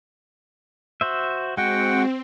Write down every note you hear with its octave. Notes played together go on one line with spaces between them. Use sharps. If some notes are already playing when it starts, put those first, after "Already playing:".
F#4 C5 E5
G#3 C4 F#4 F#5 G5